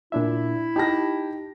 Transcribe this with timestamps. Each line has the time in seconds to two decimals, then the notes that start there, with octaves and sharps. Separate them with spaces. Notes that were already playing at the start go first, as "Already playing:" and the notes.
0.12 A#2 D4 E4 E5
0.76 D#4 G4 A5 A#6